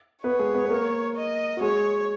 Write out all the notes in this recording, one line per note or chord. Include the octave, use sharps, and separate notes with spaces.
B3 B4 C#5
G#3 G#4
B3 B4
B4
A#3 A#4
D#5
F#4
G#3 G#4 C#5